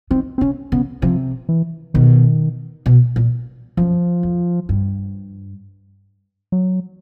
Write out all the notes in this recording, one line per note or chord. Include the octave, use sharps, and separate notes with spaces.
D#3 C4
C4
C#3 C#4
C#3 B3
C3 F3
E3
B2 D#3
B2
A#2
F#2 F3
F2
G2
F#3